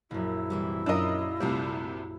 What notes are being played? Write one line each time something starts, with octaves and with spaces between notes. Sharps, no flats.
A#1 F#2 E4
C3 E3 G3
F#2 D4 F4 A#4 D#5 E5 D#6
C2 C3 G3 A3 F4 D5